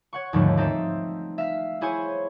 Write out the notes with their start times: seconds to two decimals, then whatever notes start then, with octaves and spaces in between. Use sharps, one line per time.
0.13 C#5 F#5 C#6
0.33 D#2 G#2 D3 F3 G3 A3
0.57 C4 D#4 A4 C5 E5
1.38 E5 F5 B6
1.81 E4 G#4 C5 C#5 G#5